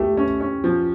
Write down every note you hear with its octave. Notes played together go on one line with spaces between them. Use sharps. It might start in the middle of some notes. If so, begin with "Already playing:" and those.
Already playing: A3 G4
C#4
C#4
F3